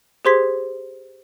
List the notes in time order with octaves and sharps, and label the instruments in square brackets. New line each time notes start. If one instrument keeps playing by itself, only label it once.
[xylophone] G4 G#4 C5 C6 G#6 B6